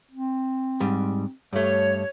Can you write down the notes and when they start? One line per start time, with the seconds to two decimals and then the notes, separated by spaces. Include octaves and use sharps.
0.12 C4
0.80 G#2 G3
1.53 G2 A3 C#5